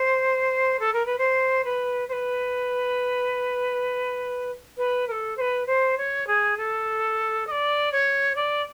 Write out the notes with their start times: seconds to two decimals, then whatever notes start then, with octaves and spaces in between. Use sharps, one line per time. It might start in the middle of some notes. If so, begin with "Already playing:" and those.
Already playing: C5
0.79 A4
0.93 A#4
1.05 B4
1.18 C5
1.64 B4
2.08 C5
2.12 B4
4.77 B4
5.07 A#4
5.11 A4
5.37 C5
5.40 B4
5.66 C5
5.97 C#5
6.27 G#4
6.57 A4
7.47 D#5
7.51 D5
7.92 C#5
8.35 D5